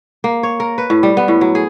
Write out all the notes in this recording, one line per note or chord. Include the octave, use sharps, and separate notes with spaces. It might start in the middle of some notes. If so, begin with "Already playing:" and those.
A#3
C#5
A#4
B4
A2
G3
B3
A2
F#3
G#4